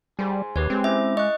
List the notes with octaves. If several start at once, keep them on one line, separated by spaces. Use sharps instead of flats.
G3 G#4 C5
D#2 G4 B4 C#5
G#3 C4 G#4
C#4 E4 E5 D6
D#5 C#6 F#6